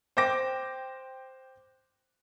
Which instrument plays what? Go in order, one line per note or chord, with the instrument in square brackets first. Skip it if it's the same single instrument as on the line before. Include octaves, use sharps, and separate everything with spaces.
[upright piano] C5 G5 D6 A#6